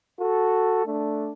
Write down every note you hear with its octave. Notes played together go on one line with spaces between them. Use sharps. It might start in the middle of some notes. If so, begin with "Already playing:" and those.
F#4 A4
A3 D4